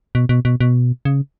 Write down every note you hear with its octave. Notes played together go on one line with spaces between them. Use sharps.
B2
B2
B2
B2
C#3